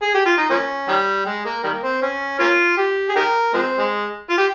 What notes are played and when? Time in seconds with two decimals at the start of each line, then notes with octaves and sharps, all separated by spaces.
0.03 G#4
0.15 G4
0.26 F4
0.38 D#4
0.50 F3 A#3 C#4
0.88 D#3 G3
1.26 G#3
1.45 A#3
1.64 D#3 G3 A#3
1.83 C4
2.02 C#4
2.40 A#3 C#4 F4
2.78 G4
3.09 G#4
3.16 D#4 G4 A#4
3.54 F3 G#3 C4
3.79 G#3
4.30 F4
4.38 G4